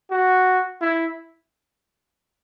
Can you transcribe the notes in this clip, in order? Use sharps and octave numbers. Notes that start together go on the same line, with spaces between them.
F#4
E4